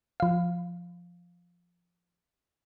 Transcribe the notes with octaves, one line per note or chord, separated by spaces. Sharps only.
F3 F5